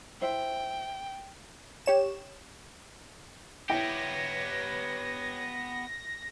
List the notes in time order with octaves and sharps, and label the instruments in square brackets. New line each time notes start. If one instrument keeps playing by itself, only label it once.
[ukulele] E4 C5 E5 [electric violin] G5
[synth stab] G4 C#5 E7
[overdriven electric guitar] B3 G4 [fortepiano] E4 G5 [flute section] B4 C#5 [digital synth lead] A#6